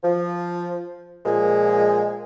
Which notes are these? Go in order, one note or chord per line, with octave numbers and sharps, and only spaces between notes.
F3
A#2 F3 G#3